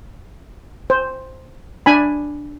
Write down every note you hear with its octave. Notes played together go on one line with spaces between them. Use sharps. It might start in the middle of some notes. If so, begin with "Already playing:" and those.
C5
D4 G#5 B5